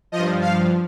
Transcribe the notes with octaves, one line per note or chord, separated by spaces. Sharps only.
F3 D#5
G2
F5